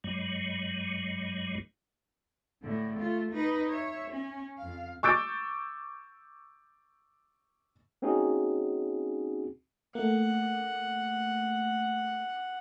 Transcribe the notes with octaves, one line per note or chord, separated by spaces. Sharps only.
G2 F#3 G#3
A2 D3
A3 F4
D#4 B4
C#5 E5
C#4
F2 F5
C#6 D6 E6 G6 A6 D7
A#3 C4 C#4 D#4 F#4 G#4
A3 A#3 F#5